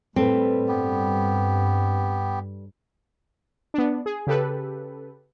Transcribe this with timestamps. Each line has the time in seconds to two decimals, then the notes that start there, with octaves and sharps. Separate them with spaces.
0.16 A2 G3 C4 A4 B4
0.68 G2 B3 G4
3.74 B3 D4
4.06 G#4
4.27 C#3 G4 A4 B4